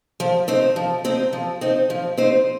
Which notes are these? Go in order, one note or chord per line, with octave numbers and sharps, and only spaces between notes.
F3
C4 D#4 C5
F3
C4 D#4 C5
F3
C4 D#4 C5
F3
C4 D#4 C5